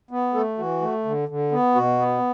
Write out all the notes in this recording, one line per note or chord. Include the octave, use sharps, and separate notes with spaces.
B3
A3 A4
E3 F#4
A3
D3
D3
B3
B2 F#4
B3